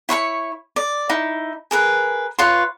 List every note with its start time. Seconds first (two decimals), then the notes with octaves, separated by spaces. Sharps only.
0.09 E4 C#5 B5 C#6
0.76 D5
1.09 D#4 E4
1.71 G#4 A#4 B4
2.39 F4 B4 C#5 C6